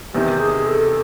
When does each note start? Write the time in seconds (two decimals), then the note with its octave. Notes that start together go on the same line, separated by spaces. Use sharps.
0.14 E2 C3 D#3 G4
0.40 G#4
0.67 A4